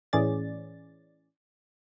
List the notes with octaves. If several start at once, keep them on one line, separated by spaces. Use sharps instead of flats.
A2 E3 C#4 G#4 D5 A6